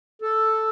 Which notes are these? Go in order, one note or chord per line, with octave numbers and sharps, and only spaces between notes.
A4